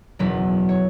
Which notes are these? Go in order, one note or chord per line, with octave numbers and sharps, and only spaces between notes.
F#1 E2 B2 F#3 B5
C#5